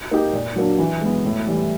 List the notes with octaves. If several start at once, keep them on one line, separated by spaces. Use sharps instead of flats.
A#3 D#4 G4
A#2
F#3 A#3 D4
E3
G#3 B3
A2
E3 G3